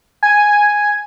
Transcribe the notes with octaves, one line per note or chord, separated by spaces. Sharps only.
G#5